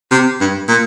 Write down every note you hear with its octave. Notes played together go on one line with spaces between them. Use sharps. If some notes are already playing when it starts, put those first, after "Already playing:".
C3
G2
A#2